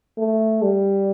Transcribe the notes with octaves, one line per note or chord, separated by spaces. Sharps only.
A3
G3